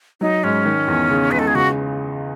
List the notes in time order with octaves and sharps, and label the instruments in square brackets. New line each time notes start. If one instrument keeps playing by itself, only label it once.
[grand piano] F#3 [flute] D#4
[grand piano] G#2 [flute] C#4
[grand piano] D#3
E2
C#3
[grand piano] C#2 [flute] B4
[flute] A4
G#4
[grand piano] C#3 [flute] F#4